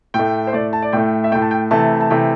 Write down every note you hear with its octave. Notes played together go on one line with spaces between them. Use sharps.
A2 G5
A3
C5
A2 A3 D5
A5
D5
A2 A3 G5
E5
A2 A3 G5
A5
G5
C3 E3 A3 A5
A5
C3 E3 A3 G5